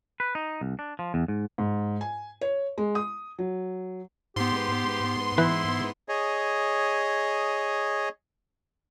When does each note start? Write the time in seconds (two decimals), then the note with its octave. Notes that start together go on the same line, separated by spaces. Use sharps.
0.20 B4
0.35 D#4
0.61 C2
0.79 D4
0.99 F3
1.14 E2
1.28 G#2
1.58 G#2
2.01 G#5
2.41 C#5
2.78 G#3
2.95 D#6
3.39 F#3
4.36 G#2 B3 G4 C6
5.38 E3 E4 B4
6.08 G#4 C#5 D#5